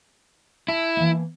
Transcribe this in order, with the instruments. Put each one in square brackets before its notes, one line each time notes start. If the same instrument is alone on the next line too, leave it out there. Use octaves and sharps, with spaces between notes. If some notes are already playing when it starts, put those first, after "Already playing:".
[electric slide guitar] E4 [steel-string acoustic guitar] A5
[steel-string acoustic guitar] E3 A#3